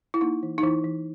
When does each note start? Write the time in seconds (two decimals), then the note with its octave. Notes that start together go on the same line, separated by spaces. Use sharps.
0.14 E4
0.21 A#3 D#4
0.43 E3
0.58 D#4
0.63 E3 E4
0.84 E3